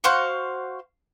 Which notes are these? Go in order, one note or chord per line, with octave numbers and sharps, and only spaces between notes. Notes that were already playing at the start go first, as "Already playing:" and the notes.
F#4 C5 F5 C#6